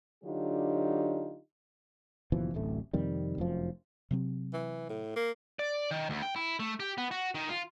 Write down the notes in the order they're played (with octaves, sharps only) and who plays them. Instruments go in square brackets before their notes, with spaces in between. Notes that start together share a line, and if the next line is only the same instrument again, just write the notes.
[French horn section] D3 F#3 D4 D#4 F4 G4
[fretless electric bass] F#1 B2 E3 F3
D1 A1 A2 A3
F2 C3 D#3 G3
F1 F#2 F3
C3 F#3 C4
[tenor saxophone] E3
A2
A#3
[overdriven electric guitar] D5
D#3
D2
G5
E4
A3
G4
B3
F#4
D#3
F4